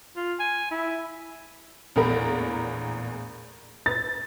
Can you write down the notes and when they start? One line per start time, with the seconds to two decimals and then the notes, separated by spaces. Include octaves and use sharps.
0.16 F4
0.40 G#5
0.71 E4
1.96 A#1 E2 A2 A#4 B5
3.86 A6